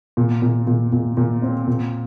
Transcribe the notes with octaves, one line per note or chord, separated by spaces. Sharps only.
A#2
A#2
A#2
A#2
A#2
C4
A#2